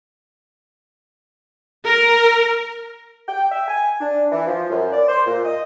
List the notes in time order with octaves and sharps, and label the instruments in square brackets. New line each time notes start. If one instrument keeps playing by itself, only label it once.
[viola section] A#4
[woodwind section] G5
E5
G#5
D4
E3
F3
F#2
D5
C5
A#2
D#5